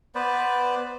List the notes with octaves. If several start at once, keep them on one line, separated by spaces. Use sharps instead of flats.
B3 B4 C5 D5